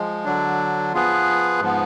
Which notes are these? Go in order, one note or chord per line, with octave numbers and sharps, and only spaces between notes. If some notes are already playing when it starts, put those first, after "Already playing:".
Already playing: F3 G#3
D3 F#3 D4
F3 B3 F4 G#4 B4
G#2 F3 B3